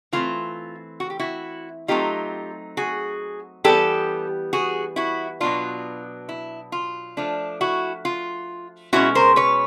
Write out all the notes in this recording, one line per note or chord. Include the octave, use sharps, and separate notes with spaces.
E3 A3 C4 F4
F#4
G4
E4 F#4
F#3 A3 C4 D#4 F4 G4
F#4 G#4
E3 G3 B3 G4 A4
F#4 G#4
E4 F#4
B2 F#3 B3 D4 F4
E4
F4
F3 A3 D4
E4 F#4
F4
B2 G#3 C#4 E4 F#4
A#4 C5
B4 C#5